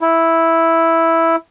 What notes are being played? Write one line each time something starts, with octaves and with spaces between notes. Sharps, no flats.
E4